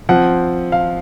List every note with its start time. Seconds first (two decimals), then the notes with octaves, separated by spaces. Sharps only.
0.09 F3 C4 F#5
0.72 F5